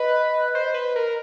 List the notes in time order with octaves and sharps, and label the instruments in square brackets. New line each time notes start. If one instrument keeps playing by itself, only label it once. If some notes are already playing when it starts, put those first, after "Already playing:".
Already playing: [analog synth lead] B4 [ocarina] D#5
[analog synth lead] C5
B4
A#4